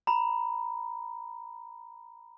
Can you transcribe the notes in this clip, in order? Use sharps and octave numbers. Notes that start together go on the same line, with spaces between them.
A#5 B5